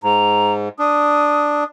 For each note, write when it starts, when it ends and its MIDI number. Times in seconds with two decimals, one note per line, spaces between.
0.03 0.69 44
0.03 0.53 82
0.79 1.64 62
0.79 1.66 87